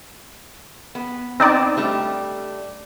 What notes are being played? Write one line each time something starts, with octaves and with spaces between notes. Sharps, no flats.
B3
B3 C4 D4 D#4 D5
G3 A3 D4